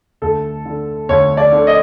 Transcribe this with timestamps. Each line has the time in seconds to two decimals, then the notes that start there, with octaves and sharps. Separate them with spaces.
0.22 D2 A4
0.65 D3
1.09 D2 C#5
1.37 D5
1.52 D3
1.67 D#5